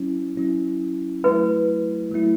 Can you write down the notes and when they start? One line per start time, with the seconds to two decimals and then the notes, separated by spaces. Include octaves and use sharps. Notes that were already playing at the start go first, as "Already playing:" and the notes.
Already playing: F#3 C#4 E4
0.37 F#3 C#4 E4
1.24 F#3 A3 E4 B4
2.12 F#3 A3 E4